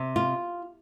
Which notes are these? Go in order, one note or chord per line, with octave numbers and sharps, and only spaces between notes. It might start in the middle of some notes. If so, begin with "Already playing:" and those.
Already playing: C3
F4